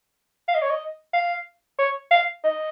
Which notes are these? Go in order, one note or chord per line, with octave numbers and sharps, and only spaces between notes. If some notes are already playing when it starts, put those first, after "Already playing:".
F5
D#5
C#5
D#5
F5
C#5
F5
D#5